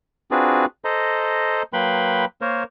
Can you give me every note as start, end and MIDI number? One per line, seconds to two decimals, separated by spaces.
0.31 0.65 60
0.31 0.65 62
0.31 0.65 65
0.31 0.65 66
0.31 0.65 68
0.31 0.65 71
0.85 1.63 69
0.85 1.63 72
0.85 1.63 75
0.85 1.63 82
1.73 2.25 54
1.73 2.25 58
1.73 2.25 71
1.73 2.25 79
1.73 2.25 83
1.73 2.25 84
2.41 2.64 58
2.41 2.64 70
2.41 2.64 72
2.41 2.64 73